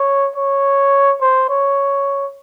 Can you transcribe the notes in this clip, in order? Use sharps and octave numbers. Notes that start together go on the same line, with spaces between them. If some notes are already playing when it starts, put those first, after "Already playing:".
Already playing: C#5
C#5
C5
C#5